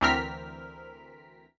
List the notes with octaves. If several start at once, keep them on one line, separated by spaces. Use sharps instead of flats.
D2 E3 C4 A#4 F6 B6